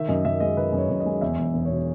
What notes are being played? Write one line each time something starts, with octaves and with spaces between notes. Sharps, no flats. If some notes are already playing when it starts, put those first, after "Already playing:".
Already playing: D#3 E5
F#2 D#5
F#2 E5
G#3 D#5
D#3 B4
F#2
C#5
F#2
D#5
G#3
E2 E5
E1
E1
C#5
B2